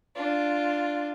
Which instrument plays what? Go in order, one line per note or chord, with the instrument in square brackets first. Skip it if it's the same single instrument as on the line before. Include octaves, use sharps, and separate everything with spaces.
[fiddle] D4 F4